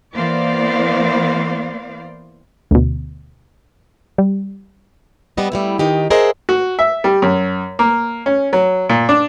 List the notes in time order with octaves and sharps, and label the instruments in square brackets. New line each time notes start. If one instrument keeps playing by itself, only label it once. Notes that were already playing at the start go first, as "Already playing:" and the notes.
[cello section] E3 A#3 B3 C5 D5 F5
[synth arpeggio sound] D2 B2
G3
[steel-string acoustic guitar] G3 B3 D#5
G3 A3 E4
D#3 D#4 G4
G#4 A#4 C5 D#5 E5 F#5
[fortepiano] F#4
E5
G3
F#2
A#3
C#4
F#3
A#2
D4